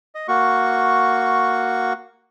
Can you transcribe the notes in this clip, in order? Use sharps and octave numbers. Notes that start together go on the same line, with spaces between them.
D#5
A#3 F#4 C#6